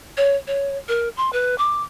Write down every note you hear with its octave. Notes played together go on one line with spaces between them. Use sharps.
C#5
C#5
A#4
C6
B4
D6